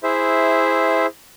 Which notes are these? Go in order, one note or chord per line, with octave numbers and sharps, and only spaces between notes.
E4 G#4 C5 E5